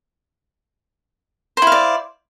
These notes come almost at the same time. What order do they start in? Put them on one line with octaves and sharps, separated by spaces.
C5 E4 F5 D5